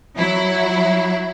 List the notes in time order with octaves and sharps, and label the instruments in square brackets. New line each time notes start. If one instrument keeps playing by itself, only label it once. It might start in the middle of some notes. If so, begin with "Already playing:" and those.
[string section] F#3 E4